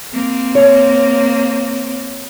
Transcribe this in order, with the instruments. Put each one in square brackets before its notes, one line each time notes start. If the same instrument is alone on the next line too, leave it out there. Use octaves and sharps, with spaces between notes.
[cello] A#3 C4
[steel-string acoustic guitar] C#5